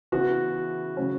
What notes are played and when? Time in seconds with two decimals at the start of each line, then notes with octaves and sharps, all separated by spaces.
0.12 C#3 E3 B3 F#4
0.97 C#3 F#3 C#4